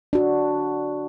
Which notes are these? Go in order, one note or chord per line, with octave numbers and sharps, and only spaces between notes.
D4 F#4